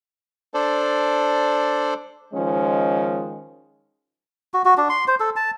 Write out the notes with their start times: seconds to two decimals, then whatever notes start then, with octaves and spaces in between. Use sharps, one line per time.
0.54 D4 A4 C5 D5
2.34 D#3 F3 G#3 C#4
4.54 F#4
4.65 F#4
4.77 D4
4.89 C6
5.08 C5
5.20 A4
5.36 A5